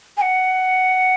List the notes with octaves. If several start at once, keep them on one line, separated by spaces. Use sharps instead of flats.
G#5
F#5